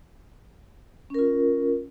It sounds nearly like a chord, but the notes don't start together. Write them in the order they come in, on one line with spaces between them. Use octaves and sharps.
C#4 A#4 F4